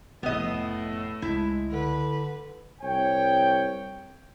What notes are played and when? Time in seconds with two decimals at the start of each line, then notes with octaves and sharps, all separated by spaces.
0.23 F1 F2 A2 B3 D#5
1.22 C#2 G#3 E4
1.71 D3 B4
2.81 C2 C#5 G5